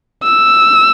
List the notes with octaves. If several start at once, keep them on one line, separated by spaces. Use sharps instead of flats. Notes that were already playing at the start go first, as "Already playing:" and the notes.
E6